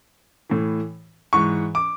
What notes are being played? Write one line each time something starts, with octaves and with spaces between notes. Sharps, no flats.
A2 E3
G#2 E3 C#6
D6